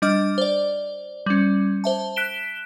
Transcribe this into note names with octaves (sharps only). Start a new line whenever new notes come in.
G3 D4 D#5 D6 F6
C5 D5
G3 C#4
C5 E5 A5
F#6 B6 D7 E7 G7